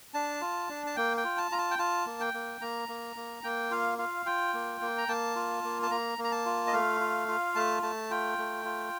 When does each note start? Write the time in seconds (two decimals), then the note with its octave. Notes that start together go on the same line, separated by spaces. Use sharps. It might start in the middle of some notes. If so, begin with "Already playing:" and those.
0.14 D4 A5
0.41 F4
0.69 D4
0.87 A5
0.96 A#3 G5
1.17 G5
1.24 F4
1.38 A5
1.51 F4 A#5
1.58 A5
1.71 G5
1.79 F4 A5
2.06 A#3
2.20 G5
2.34 A#3
2.61 A#3 A#5
2.89 A#3
3.16 A#3
3.44 A#3 G5
3.71 F4 F5
3.98 F4 F5
4.26 F4 G5
4.53 A#3
4.81 A#3
4.98 A#5
5.08 A#3 A5
5.36 F4
5.63 A#3
5.83 A5
5.91 A#3 A#5
6.18 A#3
6.24 A#5
6.32 A5
6.46 F4
6.67 D#5
6.73 A3 F5
7.01 F4
7.28 F4
7.55 A3 A5
7.83 A3 A5
8.11 F4 G5
8.38 A3
8.65 F4